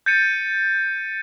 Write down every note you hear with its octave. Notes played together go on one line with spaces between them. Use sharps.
G6 A6 C#7 D#7